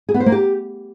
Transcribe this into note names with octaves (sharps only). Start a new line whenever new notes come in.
G#4
B3
C5
A#3
G4